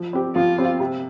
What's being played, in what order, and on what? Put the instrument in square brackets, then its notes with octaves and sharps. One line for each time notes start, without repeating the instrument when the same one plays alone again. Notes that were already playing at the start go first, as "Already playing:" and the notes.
Already playing: [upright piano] F3
C4 G4
[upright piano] F3 [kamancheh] F4
[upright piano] C4 G4
C3